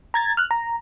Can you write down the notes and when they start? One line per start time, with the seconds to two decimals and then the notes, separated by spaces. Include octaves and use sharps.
0.14 A#5 G#6 A6
0.37 F6 F#6
0.51 A#5